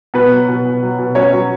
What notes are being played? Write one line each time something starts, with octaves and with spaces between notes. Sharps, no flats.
B2 B3 B4
F#3
B2
B2
F#3
B2
F#3 C#4 C#5
F#3